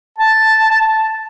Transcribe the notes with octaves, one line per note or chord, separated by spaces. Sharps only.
A5